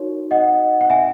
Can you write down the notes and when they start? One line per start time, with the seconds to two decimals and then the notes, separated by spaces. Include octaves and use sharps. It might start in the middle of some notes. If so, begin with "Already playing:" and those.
Already playing: D#4 F#4 A#4 C#5
0.31 D#5 F#5
0.81 F#5
0.90 E5 G#5